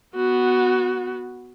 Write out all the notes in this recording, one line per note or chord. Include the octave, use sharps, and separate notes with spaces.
B3 F#4